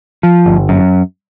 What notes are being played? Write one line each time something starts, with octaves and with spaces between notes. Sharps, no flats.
F3
G1
F#2